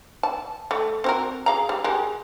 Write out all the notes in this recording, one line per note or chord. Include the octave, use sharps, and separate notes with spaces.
A5
A3
C4 F#4 A#4
G#4 F5 A#5
G3
G#3 G4 A#4